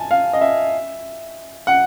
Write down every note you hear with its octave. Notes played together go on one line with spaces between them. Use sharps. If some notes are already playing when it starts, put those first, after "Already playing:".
Already playing: G#5 A5
F5
D#5
E5
F#5